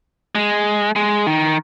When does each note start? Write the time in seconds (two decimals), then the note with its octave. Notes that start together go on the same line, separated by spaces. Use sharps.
0.35 G#3
0.96 G#3
1.27 D#3